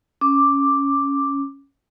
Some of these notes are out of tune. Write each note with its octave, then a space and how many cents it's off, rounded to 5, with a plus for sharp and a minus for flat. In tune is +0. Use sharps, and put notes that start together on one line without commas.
C#4 +0 D6 +0